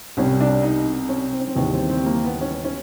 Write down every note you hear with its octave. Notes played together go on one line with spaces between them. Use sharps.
C2 B2 G3 C#4
D4
D#4
C#4
C4
C#4
C4
D#2 C#3 E3 G3 B3
C4
C4
A#3
B3
C#4
C#4